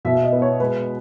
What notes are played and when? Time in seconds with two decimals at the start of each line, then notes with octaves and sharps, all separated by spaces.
0.05 B2 E5
0.15 E5
0.23 D#5
0.32 B3
0.42 C#5
0.60 G#3 B4